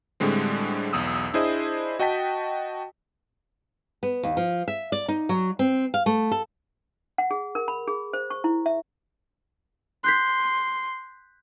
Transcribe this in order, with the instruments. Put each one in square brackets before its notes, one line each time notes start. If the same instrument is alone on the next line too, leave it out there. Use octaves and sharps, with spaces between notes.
[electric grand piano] A2 D3 G3 G#3 C4
B1 E2 D#6 E6
D4 E4 G#4 C5 D#5
F#4 D#5 G5 A5 B6
[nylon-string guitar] B3
D#2
F3
E5
D5
D#4
F#3
C4
F5
A3
A4
[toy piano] F#5
G#4
A#4
B5
G#4
C5
C#6
E4
E5
[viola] C6 [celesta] F#6 G6 B6